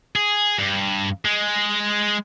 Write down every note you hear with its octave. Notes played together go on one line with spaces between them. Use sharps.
G#4
G2
G#3